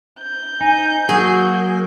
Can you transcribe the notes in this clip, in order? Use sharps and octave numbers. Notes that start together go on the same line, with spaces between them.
G6
D#4 G#5
F#3 A#3 F#4 G#4